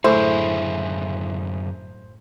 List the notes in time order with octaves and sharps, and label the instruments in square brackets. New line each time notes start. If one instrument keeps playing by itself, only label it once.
[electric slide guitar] F#2 D3 G#4 [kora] A2 [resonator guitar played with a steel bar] E4 [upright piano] C5